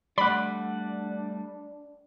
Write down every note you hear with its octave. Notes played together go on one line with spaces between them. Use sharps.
G3 A3 D4 D5 F#5 B5